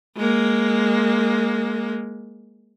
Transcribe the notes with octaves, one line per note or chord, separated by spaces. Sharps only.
G#3 A#3